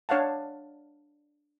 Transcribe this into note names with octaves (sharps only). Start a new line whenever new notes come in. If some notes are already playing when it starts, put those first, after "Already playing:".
D4 C#5 F5 F#5 A5